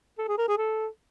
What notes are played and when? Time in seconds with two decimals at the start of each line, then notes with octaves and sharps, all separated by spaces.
0.18 A4
0.28 G#4
0.38 A#4
0.48 G#4
0.58 A4